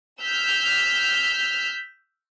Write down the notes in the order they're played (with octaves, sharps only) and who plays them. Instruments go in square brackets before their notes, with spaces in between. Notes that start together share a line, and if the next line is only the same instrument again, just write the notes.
[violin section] E6 F6 G6 B6